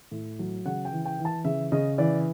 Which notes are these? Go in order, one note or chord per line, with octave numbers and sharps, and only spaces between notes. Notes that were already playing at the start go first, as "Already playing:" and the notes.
A2
F#3
C#3 F#5
G5
E3
G5
E3
A5
C#3 E5
C#3 D#5
E3 D5